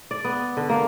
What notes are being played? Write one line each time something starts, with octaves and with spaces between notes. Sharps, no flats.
D5
B3
D3
A#3